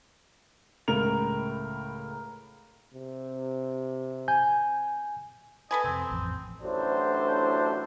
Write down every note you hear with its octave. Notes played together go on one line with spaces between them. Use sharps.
C#2 A2 A#4 F7
C3
G#5 G6
A4 B4 D#5 G#5
F2 C3 C4
A1 F2
A1 D2 F#3 D4 E4 C5